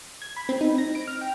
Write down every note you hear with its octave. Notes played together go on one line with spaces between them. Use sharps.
G#6
B5
C4
D#4
A#6
D7
F6
G5